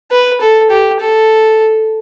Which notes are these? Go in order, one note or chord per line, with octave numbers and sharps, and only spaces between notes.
B4
A4
G4
A4